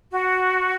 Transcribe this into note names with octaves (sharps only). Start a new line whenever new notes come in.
F#4